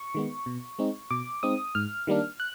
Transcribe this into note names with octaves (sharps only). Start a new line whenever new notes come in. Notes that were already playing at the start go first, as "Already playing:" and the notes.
Already playing: C#6
D#3 G#3 B3
B2
G#3 C4 D#4
B2 D6
G#3 C4 D#4 D#6
G#2 F6
D#3 G3 A#3 D4
F#6